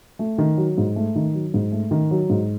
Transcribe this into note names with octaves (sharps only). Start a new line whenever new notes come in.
A3
D#3
F#3
G#2
A3
D#3
F#3
G#2
A3
D#3
F#3
G#2